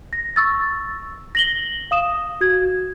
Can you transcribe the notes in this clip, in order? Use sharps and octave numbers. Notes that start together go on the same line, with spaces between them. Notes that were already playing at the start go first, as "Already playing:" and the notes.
A#6
C#6 E6 A6
A#6 F#7 G7
F5 D#6 E7
F#4 G#6